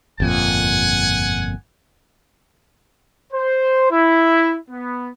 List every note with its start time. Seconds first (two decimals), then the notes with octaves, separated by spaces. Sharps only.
0.20 G1 F2 A#2 F#5 G#5
3.33 C5
3.91 E4
4.70 B3